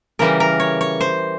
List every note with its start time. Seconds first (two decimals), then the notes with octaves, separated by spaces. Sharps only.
0.19 C#3 E3 G3 A#4
0.40 A#4
0.60 C#5
0.81 C#5
1.01 C5